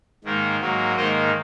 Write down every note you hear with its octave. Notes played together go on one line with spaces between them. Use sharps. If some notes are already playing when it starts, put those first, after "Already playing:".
G#2 D#3 A#3
G#2 F#3 A#3
G#2 D#3 A#3 C5 D#5